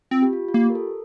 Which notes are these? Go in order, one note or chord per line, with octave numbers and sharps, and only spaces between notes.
C4 F4
G4
F4
F4
A#3 G4
A#4
A4